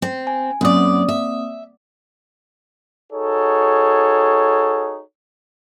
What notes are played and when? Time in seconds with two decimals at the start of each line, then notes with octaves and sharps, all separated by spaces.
0.02 C4
0.27 G#5
0.61 F#2 A#3 C4 D5 D#6
1.09 E5
3.12 D#4 F#4 G#4 A4 C#5